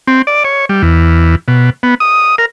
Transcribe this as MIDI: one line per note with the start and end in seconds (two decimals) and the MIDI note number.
0.07 0.22 60
0.27 0.43 74
0.44 0.65 73
0.69 0.82 55
0.82 1.36 40
1.48 1.70 47
1.83 1.95 59
2.00 2.35 87
2.38 2.46 70